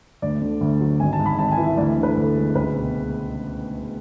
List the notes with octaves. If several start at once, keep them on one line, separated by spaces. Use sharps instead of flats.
D2 D5
D3
D2
F#3
G#1 G#5
A5
G#2
B5
G#1 A5
G#5
E3
E5
D2 D5
D3
B4
D2 A4
G#3
C#2 B4
B2